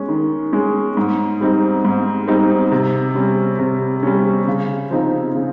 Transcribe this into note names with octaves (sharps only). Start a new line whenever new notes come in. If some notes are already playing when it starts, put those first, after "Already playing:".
Already playing: G#3 C#4
D#3
G#3 C#4
G#2
G3 C4 D#4
G#2
G3 C4 D#4
C3
G3 C#4
C3
G3 C#4
C#3
F3 C4 D#4
C#3